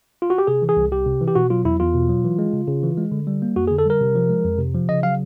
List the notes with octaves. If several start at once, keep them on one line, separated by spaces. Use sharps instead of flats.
F4
F#4
G4
C3 G#4
E3
G#4
C2
C2 G4
C3
E3
G4
B2 F#4
F#3 F4
E2 E4
E2 F4
B2
F#3
E3
G#3
C#3
C#3
E3
G#3
D3
G3
A#3
F2 F#4
G#4
D3
A4
G3 A#4
C3
F3
G#3
F2
C3
F3
C#3 D#5
F#3 F5